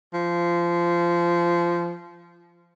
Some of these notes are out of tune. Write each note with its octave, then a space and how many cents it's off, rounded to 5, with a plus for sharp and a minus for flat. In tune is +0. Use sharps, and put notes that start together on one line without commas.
F3 -20